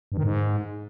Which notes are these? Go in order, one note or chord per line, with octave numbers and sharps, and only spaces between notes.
G2
D#3
G#2